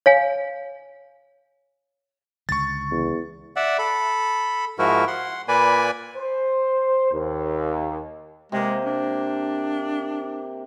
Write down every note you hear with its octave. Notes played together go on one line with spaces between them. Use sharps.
C#5 F5 G#5
C#2 D3 C#6 A6
E2
D5 E5 F#5
A4 B5
G#2 F3 E4 F#4 A#4
F#5 C6
A#2 A#3 B4 D5 G#5 B5
C5
D#2
C3 G#3 A#3
D4